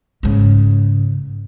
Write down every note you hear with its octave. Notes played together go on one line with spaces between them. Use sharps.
G#2 C#3